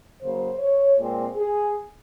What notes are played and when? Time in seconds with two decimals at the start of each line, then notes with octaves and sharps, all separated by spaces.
0.21 C#3 F#3 A#3 C5
0.59 C#5
0.97 A#2 G#3 C4
1.36 G#4